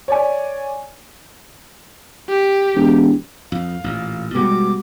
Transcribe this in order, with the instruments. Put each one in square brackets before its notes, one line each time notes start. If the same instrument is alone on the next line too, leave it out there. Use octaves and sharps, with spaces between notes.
[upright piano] C#5 D5 G#5
[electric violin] G4
[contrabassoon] E1
[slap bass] F2 [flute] F5
[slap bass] A1 A#2
[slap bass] B2 G#3 B3 [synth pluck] G3 F#4 G4 [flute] D6